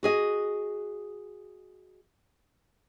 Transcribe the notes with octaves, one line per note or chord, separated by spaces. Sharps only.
F#4 G#4 D#5